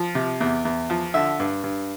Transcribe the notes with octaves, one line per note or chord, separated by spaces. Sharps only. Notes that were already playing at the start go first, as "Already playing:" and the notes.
Already playing: F3
C3
E2
E2
F3
D3 E5
G2
G2